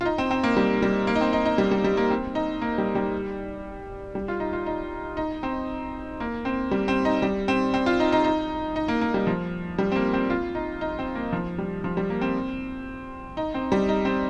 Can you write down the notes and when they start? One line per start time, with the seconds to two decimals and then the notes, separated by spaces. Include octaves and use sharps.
0.01 F4
0.05 D#4
0.18 C4
0.31 C4
0.43 A#3
0.56 G3
0.82 G3
1.07 A#3
1.15 D#4
1.21 C4
1.33 D#4
1.45 D#4
1.58 G3
1.71 G3
1.84 G3
1.97 A#3
2.11 C4
2.35 D#4
2.62 A#3
2.78 G3
2.95 G3
4.15 G3
4.28 F4
4.40 D#4
4.53 F4
4.66 D#4
5.17 D#4
5.43 C4
6.20 A#3
6.45 C4
6.71 G3
6.88 C4
7.05 D#4
7.22 G3
7.48 C4
7.74 C4
7.86 F4
8.00 D#4
8.12 D#4
8.24 D#4
8.76 D#4
8.88 A#3
9.01 A#3
9.14 G3
9.27 F3
9.78 G3
9.92 C4
9.96 A#3
10.13 C4
10.30 F4
10.55 D#4
10.81 D#4
10.99 C4
11.15 A#3
11.33 F3
11.58 G3
11.84 F3
11.97 G3
12.10 A#3
12.21 C4
13.37 D#4
13.54 C4
13.72 G3
13.89 D#4
14.05 C4